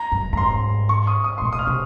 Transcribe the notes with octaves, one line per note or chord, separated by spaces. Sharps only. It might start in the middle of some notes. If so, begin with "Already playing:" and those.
Already playing: A#5
F#2
F#2 A#5
G#2 C6
C#6
D#6
D#6
C6
A#2 C#6
D#6
F6
C3